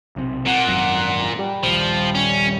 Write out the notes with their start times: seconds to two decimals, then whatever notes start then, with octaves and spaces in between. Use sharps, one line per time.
0.16 B1 C3
0.47 A#2 F#5
0.67 G#1 F#2
1.39 G3
1.63 A#1 D#2 F3
2.15 C#4